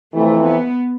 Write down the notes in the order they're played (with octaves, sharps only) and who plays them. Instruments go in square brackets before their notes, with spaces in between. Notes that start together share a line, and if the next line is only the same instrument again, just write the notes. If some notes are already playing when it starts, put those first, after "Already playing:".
[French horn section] F2 C3 E3 [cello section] A3
[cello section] B3